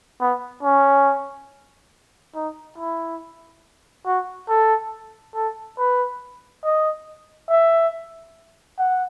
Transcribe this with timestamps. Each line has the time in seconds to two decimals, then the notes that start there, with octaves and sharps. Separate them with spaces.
0.21 B3
0.63 C#4
2.35 D#4
2.78 E4
4.06 F#4
4.49 A4
5.35 A4
5.78 B4
6.64 D#5
7.50 E5
8.78 F#5